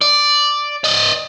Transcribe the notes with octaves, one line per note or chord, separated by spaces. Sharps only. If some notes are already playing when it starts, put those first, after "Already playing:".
D5
D5 D#5